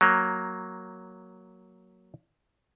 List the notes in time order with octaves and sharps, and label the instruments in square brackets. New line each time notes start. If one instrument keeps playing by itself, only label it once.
[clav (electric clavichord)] F#3 A#3